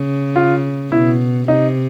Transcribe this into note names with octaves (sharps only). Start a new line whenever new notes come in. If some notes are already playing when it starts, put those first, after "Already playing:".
Already playing: C#3
F4
B2 E4
C3 D#4